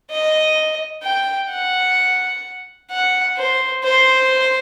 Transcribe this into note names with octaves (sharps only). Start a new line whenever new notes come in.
D#5
G5
F#5
F#5
C5
C5